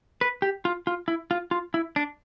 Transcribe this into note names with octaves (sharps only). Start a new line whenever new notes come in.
B4
G4
F4
F4
E4
F4
F4
E4
D4